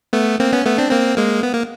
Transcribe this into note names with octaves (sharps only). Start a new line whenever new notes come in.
A3 B3
A#3 C4
B3 C#4
A3 B3
C4 D4
A#3 C4
G#3 A#3
B3
A#3